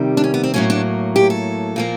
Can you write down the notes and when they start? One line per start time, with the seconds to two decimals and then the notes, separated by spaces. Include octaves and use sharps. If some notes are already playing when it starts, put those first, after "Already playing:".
Already playing: C3 D#3 G3
0.17 D4
0.24 C#4
0.34 B3
0.44 C4
0.54 A2 F#3 A#3 C#4
0.70 D4
1.16 G4
1.30 A4
1.76 A#2 F3 A#3